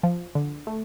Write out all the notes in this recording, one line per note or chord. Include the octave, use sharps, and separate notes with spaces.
F3
D3
A3